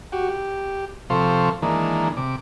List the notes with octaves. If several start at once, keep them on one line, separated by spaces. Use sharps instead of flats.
F#4 G4
G4
C3 F3 A4 C5 F5 C#6
D#3 E3 G#3 A#3 D4
C3 D6